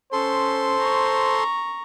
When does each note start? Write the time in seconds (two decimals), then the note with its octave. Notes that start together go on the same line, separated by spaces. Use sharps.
0.13 C#4 A4 C5 C6
0.80 A#5 C#6